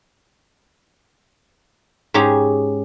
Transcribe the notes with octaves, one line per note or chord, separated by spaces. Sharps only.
G#2 C#4 G4 G#4 A#5